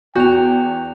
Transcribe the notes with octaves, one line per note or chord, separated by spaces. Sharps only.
E2 F#4 G5 G6 F7